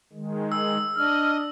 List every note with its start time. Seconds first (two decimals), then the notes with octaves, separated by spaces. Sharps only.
0.13 D#3 G#3
0.52 E6
0.96 D4 D#5 F6